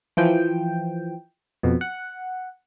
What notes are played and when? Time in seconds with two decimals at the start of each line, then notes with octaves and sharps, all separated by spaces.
0.17 E3 F3 G5
1.63 F2 B2
1.81 F#5